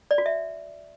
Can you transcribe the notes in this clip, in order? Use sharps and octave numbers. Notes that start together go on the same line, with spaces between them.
D5
F#4
E5